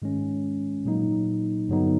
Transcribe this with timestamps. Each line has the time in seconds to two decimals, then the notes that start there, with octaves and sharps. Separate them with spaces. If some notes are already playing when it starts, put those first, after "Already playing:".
0.02 G#2 D#3 G#3 C#4
0.85 A#2 F#3 A#3 D#4
1.69 G2 D3 F#3 B3 D#4